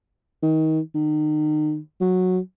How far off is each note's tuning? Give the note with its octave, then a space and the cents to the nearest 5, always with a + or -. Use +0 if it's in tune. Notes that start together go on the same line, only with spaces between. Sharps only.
D#3 +25
D#3 -35
F#3 -10